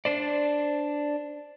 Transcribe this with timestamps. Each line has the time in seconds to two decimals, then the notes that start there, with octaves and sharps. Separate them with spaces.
0.05 D4 C5 D5